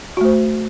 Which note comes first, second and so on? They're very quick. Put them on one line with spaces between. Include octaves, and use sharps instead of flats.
F#4 A3 C5